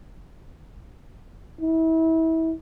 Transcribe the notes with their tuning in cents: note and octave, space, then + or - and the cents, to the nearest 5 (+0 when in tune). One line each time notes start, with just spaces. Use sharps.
E4 -30